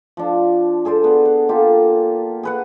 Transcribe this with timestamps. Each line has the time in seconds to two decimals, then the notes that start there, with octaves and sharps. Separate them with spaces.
0.17 F3 D4
0.85 G#4 A4 C5 D5
1.04 B3
1.25 F#5
1.49 A#3 F4 G4 A4
2.43 G#4 B4 F#5